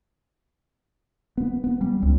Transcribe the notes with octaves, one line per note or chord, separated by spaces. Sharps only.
B3
B3
G3
C#2